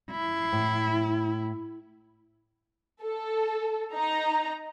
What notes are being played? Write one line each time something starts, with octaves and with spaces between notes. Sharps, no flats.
E4
A2
A4
D#4 A#5